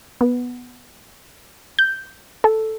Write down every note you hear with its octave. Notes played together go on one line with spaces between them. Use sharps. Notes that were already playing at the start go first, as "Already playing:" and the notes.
B3
G6
A4